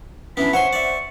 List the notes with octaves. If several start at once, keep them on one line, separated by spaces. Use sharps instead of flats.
E3 B3 C#4 D4 B5
C5 C#5 E5 F#5 G#5 C6 C#6
D5 E5